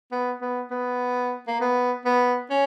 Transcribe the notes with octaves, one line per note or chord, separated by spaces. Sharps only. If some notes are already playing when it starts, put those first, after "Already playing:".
B3
B3
B3
A#3
B3
B3
C#4